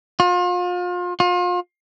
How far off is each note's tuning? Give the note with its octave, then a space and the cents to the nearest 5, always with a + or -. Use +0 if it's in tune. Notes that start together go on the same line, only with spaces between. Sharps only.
F4 +35
F4 +35